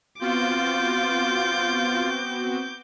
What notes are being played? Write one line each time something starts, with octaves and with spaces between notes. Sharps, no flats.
B3 C4 F4 F#4 D6 G6